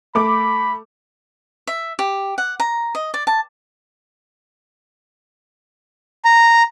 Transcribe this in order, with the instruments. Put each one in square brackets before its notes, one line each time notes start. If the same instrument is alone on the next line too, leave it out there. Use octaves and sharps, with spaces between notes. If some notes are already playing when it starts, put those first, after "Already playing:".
[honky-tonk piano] A3 D6 [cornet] B5
[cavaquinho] E5
G4
F#5
A#5
D#5
D5
A5
[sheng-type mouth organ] A#5